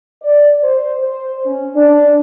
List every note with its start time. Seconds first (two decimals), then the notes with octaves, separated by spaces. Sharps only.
0.22 D5
0.63 C5
0.99 C5
1.46 C#4
1.76 D4